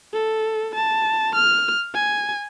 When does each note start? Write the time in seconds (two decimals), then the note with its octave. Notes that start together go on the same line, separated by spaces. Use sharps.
0.14 A4
0.75 A5
1.35 F6
1.94 G#5